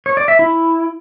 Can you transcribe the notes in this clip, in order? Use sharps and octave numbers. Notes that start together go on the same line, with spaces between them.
C#5
D5
E5
E4